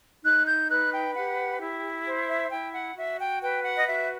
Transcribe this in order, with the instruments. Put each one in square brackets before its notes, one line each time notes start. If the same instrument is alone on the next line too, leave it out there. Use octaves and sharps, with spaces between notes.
[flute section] D#4 F#6
G6
B4 F#6
G5
G4 F#5
E4
C5
E5
E4 G5
F#5
F#4 E5
G5
B4 G5
F#5
D#5
F#4 E5